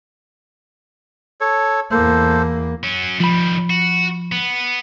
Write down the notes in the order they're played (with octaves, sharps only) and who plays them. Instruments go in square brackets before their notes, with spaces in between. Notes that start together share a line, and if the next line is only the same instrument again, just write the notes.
[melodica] A4 C#5
[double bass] E2 A#3 [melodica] A4 C5
[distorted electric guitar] F#3 C#4
[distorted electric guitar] D#3 G3 [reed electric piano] F3 B5
[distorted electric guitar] F#4
B3